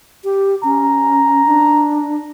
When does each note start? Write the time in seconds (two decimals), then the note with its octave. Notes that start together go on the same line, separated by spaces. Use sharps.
0.24 G4
0.64 C#4 A#5
1.46 D4